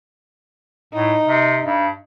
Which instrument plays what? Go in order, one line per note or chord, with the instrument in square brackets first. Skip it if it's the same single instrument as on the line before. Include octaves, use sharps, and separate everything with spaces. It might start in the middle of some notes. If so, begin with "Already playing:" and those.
[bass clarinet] A2 [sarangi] D#4
[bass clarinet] C3
G2